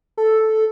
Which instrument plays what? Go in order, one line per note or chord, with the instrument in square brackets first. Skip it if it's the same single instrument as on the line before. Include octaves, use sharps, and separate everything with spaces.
[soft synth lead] A4